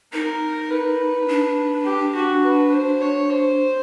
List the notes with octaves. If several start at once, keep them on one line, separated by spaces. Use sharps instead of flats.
D#4 A#4
B4
D4
G4
F#4
B4
C5
C#5
C5